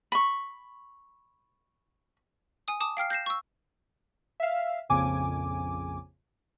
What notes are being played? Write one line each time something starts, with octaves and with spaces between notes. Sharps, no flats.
B5 C#6
G#5 D#6
A5 D6 D#6
F5 G5 F6 C7
G6 A#6 C7 E7
C#6 E6
E5 F5
A#1 F2 C#3 G#5 D6